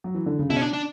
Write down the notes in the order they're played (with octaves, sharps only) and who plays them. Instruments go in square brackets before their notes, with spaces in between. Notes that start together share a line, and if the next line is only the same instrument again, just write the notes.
[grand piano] F#3
E3
D3
C#3
[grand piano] B2 [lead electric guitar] E4
[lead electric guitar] C#4
D4
D4